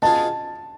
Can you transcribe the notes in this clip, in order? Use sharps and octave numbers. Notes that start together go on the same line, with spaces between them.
B2 B3 F4 G#4 A5